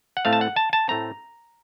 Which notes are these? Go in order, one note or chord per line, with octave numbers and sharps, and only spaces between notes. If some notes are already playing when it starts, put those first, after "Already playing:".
F#5
A2 A3 C4 F5
A5
F#5
A5
A5
A2 A3 C4 A#5